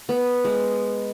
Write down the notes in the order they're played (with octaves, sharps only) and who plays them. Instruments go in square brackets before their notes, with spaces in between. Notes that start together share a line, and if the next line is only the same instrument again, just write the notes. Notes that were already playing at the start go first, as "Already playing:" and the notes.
[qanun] B3
G#3